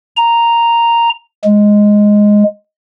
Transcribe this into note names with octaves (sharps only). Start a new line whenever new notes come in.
A#5
G#3